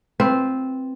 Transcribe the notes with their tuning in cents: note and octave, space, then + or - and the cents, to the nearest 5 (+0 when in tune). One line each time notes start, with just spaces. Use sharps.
C4 +0 F4 +0 B4 +0